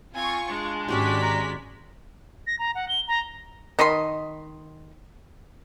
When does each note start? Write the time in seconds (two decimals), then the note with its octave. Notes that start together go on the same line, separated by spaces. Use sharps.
0.15 C4 F4 G#5 C#6
0.49 G#3 D4
0.88 G#1 C#4 F#4 G4 D5 B6
1.22 A#5
2.47 A#6
2.59 A#5
2.75 F#5
2.89 G7
3.08 A#5
3.79 D#3 D#5 B5 C6